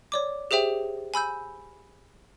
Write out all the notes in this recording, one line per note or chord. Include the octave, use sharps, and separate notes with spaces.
C#5 D5 D6
G4 G#4 C5 E5 G5
G#5 B5 E6 G6